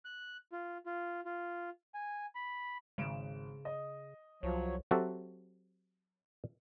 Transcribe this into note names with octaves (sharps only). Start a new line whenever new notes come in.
F#6
F4
F4
F4
G#5
B5
G#1 C#3 D7 E7
D#5
C2 F3 F#3 C#5
F#3 C4 F#4 G4 A4 E5